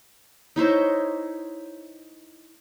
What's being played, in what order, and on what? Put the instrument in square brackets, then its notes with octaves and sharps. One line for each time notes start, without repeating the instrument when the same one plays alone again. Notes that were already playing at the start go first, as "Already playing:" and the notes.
[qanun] D#4 E4 C5 C#5